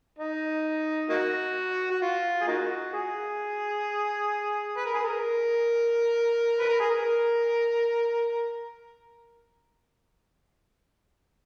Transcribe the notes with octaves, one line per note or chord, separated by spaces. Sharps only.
D#4
A#3 D#4 F#4
F#4
F4
G#4
A#3 D#4 F#4
G#4
B4
A#4
G#4
A#4
B4
A#4
G#4
A#4